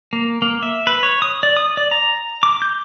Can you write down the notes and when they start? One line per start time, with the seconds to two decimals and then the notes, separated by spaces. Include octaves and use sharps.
0.13 A#3
0.42 A#3
0.63 E5
0.87 B4
1.03 C#5
1.22 D#6
1.43 D5
1.57 D#6
1.77 D5
1.91 A#5
2.43 D6
2.62 G6